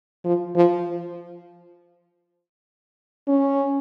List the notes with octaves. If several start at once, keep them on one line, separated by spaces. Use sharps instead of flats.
F3
F3
C#4